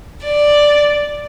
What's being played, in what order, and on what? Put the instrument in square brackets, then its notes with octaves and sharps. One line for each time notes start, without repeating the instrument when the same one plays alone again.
[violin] D5